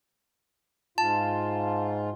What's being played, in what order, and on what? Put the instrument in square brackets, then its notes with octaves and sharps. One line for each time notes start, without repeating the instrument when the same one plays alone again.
[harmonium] G#2 F4 [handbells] A5